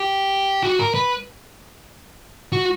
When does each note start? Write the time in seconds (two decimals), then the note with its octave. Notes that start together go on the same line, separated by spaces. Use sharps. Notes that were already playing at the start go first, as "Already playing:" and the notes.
Already playing: G4
0.63 F#4
0.79 A#4
0.94 B4
2.53 F#4